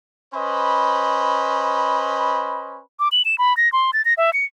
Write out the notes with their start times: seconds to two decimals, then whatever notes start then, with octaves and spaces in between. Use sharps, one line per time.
0.34 C#4 B4 C5 D#5 B5
3.00 D6
3.12 F#7
3.25 E7
3.38 B5
3.57 A#6
3.73 C6
3.93 A6
4.05 A#6
4.18 E5
4.33 C#7